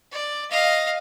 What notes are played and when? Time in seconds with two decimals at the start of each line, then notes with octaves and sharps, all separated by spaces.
0.12 D5
0.51 D#5 F5